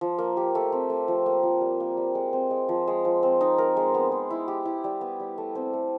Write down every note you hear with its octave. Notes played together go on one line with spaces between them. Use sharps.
F3
A#3
G4
A3
C4
A3
F3
A#3
F3
G3
A#3
G3
G#3
C4
G#3
F3
G#3
F3
C4
D#4
A#4
G#3
B3
G#3
E4
G4
E4
G3
B3
G3
A3
C4
A3